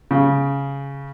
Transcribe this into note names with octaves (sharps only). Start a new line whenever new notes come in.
C#3